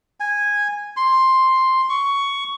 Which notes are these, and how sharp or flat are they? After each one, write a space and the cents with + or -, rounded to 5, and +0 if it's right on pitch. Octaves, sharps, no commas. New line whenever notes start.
G#5 -10
C6 +5
C#6 +10